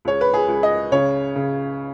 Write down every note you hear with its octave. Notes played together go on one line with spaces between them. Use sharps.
C#2 C#5
B4
G#4
C#2
D#5
C#3 C#5
C#3